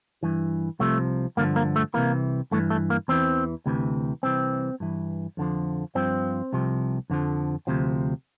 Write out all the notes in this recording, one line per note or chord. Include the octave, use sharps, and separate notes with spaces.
G2 E3
C2 C3 F3 A3
G2 D3 F3 A#3
A#3
A3
C2 C3 E3 A#3
G2 E3 A3
A3
A#3
E2 E3 C4
D2 C3 E3
C2 C3 E3 C4
G2 E3
F2 D3 F3
G2 F3 C4
C2 C3 F3
F2 D3 F3
D2 C3 F3